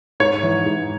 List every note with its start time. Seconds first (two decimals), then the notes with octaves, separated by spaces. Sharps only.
0.20 G#2 C#5
0.43 E3
0.66 G#2